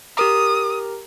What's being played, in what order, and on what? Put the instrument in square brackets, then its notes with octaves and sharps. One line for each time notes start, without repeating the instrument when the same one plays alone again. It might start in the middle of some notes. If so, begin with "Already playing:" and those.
[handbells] G4 A#4 A#5 [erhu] D#6